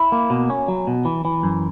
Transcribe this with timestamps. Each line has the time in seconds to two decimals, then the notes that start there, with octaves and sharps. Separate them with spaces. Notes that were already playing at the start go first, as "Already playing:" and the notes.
Already playing: E4
0.12 A#3
0.30 B2
0.50 C#4
0.68 F#3
0.87 B2
1.05 E3
1.25 E3
1.43 F#2